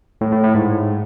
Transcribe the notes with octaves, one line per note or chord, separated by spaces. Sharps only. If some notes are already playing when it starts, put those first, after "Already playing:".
A2
A2
A2
G#2